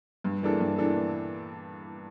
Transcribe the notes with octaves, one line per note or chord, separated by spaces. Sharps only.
G2
E3 A#3 D4 A4
G2
E3 A#3 D4 A4